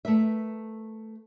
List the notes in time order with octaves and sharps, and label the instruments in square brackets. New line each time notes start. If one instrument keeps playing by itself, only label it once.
[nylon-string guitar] A3 A#4 B4 E5